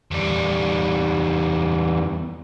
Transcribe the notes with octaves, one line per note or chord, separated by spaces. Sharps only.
E2 G3